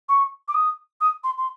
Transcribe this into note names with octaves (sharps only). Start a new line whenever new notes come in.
C#6
D6
D#6
D#6
C6
C6